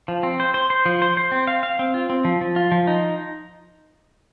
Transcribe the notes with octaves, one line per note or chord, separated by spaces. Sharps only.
F3
C4
C5
C5
C5
F3
C5
C5
C4
F5
F5
C4
F4
C4
F3
F3
F4
F3
D#4